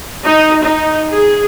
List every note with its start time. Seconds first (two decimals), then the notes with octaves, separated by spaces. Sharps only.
0.25 D#4
0.63 D#4
1.10 G#4